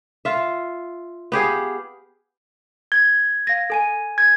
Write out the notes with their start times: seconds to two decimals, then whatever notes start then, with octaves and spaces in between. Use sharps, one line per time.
0.25 F4 E5
1.32 B3 G4 G#4 F5
2.92 G#6 G7
3.47 F5 A#6
3.70 A4 G#5 D#7
4.18 G#6